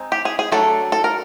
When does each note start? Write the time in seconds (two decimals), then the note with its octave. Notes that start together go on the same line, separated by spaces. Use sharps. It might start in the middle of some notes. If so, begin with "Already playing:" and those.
Already playing: G#3 C4 D#4
0.12 G4
0.25 G#4
0.39 G#4
0.52 F#3 A3 D4 A4
0.92 A4
1.04 A#4